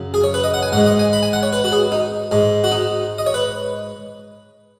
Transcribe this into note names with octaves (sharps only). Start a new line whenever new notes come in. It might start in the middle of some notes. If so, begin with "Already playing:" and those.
Already playing: F#2 C#3 F#3
G#4
C#5
B4
D#5
F#5
G#5
G#2 G#3 F#5
D#5
G#5
B5
G#5
F#5
C#5
B4
F#4
G#4
D#4
G#2 G#3
F#4
D#4
D#5
C#5
B4